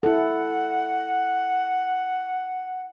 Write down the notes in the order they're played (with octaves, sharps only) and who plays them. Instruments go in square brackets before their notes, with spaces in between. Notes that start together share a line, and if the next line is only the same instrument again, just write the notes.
[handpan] E4 A4 [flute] F#5